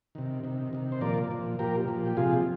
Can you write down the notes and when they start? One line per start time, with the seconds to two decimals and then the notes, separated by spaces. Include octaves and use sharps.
0.15 C3 D#3
0.44 C3 D#3
0.73 C3 D#3
0.92 C5
1.01 A#2 F3 A#4 D5
1.30 A#2 F3
1.59 A#2 F3 G4 A#4
1.88 A#2 F3
2.06 G4
2.17 C3 F3 F4 G#4